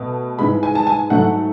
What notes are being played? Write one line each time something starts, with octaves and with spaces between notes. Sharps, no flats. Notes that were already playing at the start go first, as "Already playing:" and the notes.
Already playing: B2 A3
G#2 E3 G#3 B5
G#5
A5
G#5
G#2 F#3 A3 F#5